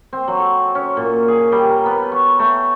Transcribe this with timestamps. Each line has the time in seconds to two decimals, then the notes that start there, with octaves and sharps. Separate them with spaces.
0.13 C4
0.28 F#3
0.40 A4
0.75 C#4
0.97 A#2
1.28 G#4
1.52 G3
1.70 A#4
1.86 B3
2.12 C#6
2.39 A3